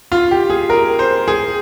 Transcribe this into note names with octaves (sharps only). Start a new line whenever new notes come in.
F4
G4
G#4
A#4
C5
G#4